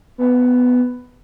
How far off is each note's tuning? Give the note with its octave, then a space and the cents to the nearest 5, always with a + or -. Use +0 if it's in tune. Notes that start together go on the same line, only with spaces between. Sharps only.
B3 +10